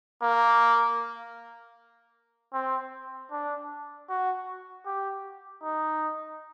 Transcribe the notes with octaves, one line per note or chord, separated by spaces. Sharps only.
A#3
C4
D4
F#4
G4
D#4